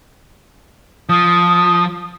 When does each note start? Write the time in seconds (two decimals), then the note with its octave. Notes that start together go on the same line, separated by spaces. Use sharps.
1.09 F3 D#6